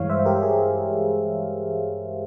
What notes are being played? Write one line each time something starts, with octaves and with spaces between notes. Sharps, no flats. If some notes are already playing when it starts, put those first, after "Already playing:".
Already playing: G2 E3 G#3 C#5 F5
C5 E5
G4 A#4
G#4